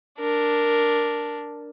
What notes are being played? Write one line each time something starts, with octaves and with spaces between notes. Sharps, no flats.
D4 A#4